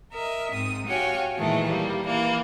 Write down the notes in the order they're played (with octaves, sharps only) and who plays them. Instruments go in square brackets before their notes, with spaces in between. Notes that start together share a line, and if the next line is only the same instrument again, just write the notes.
[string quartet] A#4 D#5 E5
G#2 C4 D#6
F#4 G4 C#5 F5 G5 G#5
A#2 D#3 E3 G#3 A3 A4
G3 A#3
E3 A#3